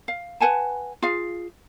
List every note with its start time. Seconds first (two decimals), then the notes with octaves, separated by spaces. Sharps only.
0.08 F5
0.40 B4 F#5 G#5 A5
1.02 F4 G#4 F5